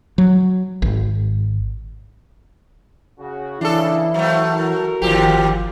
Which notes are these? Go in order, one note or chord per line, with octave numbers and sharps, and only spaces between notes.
F#3
G#1
C#3 F#4
C#3 E3 D4 E4 A4
F#3 A3 C5 E5 F5
F#4 A#4
G1 D#2 G#2 F3 G4